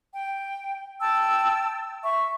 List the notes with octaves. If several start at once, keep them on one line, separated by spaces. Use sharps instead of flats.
G5
G5 A5 E6
E5 C#6